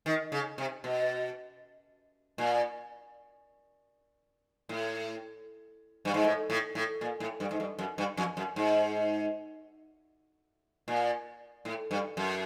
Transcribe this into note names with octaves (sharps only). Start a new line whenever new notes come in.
D#3
C#3
C3
B2
A#2
A2
G2
G#2
A2
A2
A2
A#2
A2
G2
G#2
G2
F#2
G2
F2
F#2
G#2
A#2
A2
G2
F#2